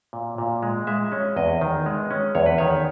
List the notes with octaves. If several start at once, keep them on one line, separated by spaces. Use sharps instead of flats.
A#2
A#2
G#3
G#3 E5
C#4
E2 D#5
D#3
G#3
C#4
E2 C#5
B4
D#3 C#5